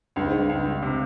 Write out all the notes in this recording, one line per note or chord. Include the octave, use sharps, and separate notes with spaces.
C#2 G2
G#2
C#2
G2
C#2
C#2
C3